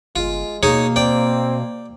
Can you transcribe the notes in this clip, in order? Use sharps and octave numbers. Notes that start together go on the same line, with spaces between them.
G1 G#3 F4
B2 A#3 D#4 G#4 C#5
C4 D5 G5